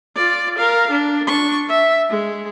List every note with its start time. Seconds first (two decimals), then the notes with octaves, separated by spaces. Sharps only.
0.15 F4 D5
0.58 A#4 F5
0.91 D4
1.27 D4 C#6
1.69 E5
2.09 G#3